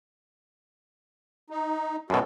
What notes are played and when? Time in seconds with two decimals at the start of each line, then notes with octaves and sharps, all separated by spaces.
1.50 D#4
2.10 F#2 B2 F#4 A4